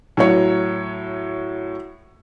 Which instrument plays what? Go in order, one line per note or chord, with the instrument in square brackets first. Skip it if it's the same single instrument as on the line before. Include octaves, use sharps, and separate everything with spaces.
[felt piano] A2 F#3 C#5